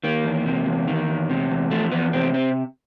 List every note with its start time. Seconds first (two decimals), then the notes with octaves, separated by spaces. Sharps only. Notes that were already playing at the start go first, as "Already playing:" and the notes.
0.04 D#3 A#3
0.25 E2
0.46 C3
0.66 E2
0.88 D#3
1.08 E2
1.29 C3
1.51 E2
1.71 F3 A3
1.92 E2 B3
2.13 C3 C4
2.34 C4